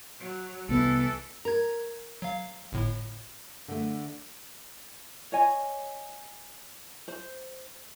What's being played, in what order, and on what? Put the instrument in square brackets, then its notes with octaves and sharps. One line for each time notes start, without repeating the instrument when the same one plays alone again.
[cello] F#3
[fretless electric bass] C2 B3 [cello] E3 A4
[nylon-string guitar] A#4 [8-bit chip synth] A#5 G#6
[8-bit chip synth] F#3 F5
G1 A2
[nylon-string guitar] D3 A3
[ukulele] C#5 D#5 G#5
C5